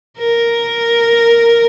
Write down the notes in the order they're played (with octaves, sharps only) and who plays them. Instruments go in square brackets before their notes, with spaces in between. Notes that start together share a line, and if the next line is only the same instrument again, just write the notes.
[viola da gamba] A#4